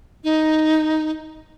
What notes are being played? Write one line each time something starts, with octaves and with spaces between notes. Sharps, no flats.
D#4